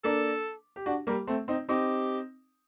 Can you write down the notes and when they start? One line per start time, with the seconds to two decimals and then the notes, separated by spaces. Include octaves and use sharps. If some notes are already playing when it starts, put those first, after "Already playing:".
0.04 A#3 D4 A4
0.76 G4
0.86 D4 F#4
1.07 G3 A#3
1.27 A3 C4
1.48 C4 D#4
1.69 C4 D#4 G4